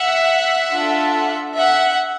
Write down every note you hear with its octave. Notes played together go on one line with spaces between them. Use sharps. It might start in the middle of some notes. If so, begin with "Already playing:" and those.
Already playing: E5 F#5
D4 F4 A4
E5 F#5